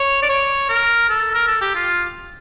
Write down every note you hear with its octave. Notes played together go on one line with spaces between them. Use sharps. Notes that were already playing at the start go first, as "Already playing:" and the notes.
Already playing: C#5
D5
C#5
A#4
A4
A#4
A4
G4
F4